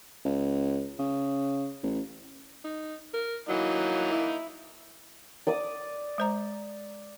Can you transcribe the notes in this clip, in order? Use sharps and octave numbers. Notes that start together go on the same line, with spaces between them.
C#2
C#3
A1
D#4
A#4
E3 F#3 A#3 D#4
E4
D5 D6 D#6
G#3 C5 A#5